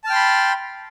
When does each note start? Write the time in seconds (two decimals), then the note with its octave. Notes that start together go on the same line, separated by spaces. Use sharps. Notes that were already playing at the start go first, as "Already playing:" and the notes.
0.04 A5
0.07 F6
0.10 G5
0.12 C6
0.15 B5